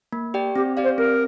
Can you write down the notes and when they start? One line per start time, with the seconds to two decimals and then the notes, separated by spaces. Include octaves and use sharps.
0.13 A#3
0.34 G4 D5 G5
0.56 C4 G4
0.77 G4 D5 F5
0.84 C5
0.97 C4 A#4